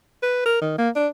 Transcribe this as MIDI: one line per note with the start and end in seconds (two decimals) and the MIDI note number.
0.23 0.44 71
0.45 0.61 70
0.61 0.74 51
0.78 0.89 58
0.96 1.08 62